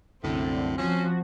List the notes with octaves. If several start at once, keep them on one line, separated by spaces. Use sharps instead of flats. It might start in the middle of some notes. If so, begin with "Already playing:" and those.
C2 F#2 A2 D3 C4
F3 C#4 F#4